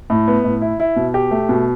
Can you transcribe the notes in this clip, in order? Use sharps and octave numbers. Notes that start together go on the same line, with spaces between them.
A2
B3
A2
E4
E4
B2
G4
A3
B2